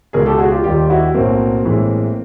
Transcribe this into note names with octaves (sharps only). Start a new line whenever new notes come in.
C#2 B2 G#3 G#4 A#4
G4 A4
F#4 G#4
F4 G4
D#2 D#3 G3 F4 G4
E4 F#4
B1 A2 F#3 A#3 C4
A1 A2 E3 G#3